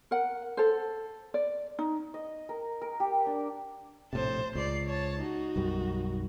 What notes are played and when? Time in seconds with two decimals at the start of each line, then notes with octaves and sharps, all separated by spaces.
0.11 A#4 F#5
0.57 A4 C5
1.34 D5
1.79 D#4
2.14 D#5
2.49 A#4
2.81 A#4
3.00 G4
3.26 D4
4.13 A#1 A2 C3 C5 A5
4.55 C#2 D5 C7
4.86 C#5 A5
5.20 D#4 F#4
5.56 B1 F#2 G3